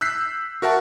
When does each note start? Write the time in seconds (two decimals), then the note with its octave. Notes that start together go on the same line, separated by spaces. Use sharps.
0.01 E6 F#6 G6 B6 C7
0.62 F#4 A#4 E5 F#5 A5